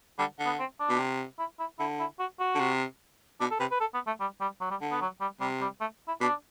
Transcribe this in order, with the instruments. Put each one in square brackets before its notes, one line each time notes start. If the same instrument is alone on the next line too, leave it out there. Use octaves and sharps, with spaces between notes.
[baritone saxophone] D3 [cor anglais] G3
[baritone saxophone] D3
[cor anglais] B3
C4
D4
[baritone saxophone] B2
C3
[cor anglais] E4
E4
[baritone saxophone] D3 [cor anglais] E4
[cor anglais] E4
F#4
F#4
[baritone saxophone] D3
C3
[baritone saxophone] B2 [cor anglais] D4
[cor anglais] A4
[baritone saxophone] C3 [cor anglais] B4
[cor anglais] B4
A4
B3
A3
G3
G3
F#3
G3
[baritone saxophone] D3
[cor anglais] B3
F#3
G3
[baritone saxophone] C3 [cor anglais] G3
[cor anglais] G3
A3
E4
[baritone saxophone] B2 [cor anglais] D4